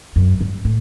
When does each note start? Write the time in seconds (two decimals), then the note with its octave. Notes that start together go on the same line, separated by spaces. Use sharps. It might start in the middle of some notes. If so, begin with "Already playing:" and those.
0.16 F#2
0.41 G2
0.65 A2